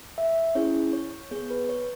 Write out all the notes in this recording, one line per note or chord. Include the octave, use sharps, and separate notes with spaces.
E5
C#4 E4 G#4 C#5
C#5
B3 G#4 C#5
B4
C#5